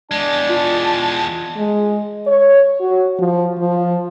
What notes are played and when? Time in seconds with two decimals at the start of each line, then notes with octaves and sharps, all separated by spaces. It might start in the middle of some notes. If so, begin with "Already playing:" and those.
0.11 E2 G#3 D4 A5
0.49 F4
1.57 G#3
2.27 C#5
2.81 F#4
3.19 F3
3.59 F3